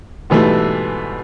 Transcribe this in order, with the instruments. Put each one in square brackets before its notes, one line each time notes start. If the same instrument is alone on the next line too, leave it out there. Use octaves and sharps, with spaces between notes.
[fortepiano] G#2 B2 E3 G3 A3